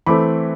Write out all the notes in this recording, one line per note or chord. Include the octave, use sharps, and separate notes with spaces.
E3 A3 C4 B5 D6